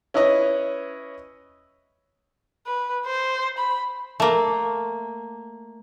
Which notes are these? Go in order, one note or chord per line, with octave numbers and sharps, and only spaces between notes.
C#4 E4 B4 C#5 D#5
B4
C5
B5
A3 A#3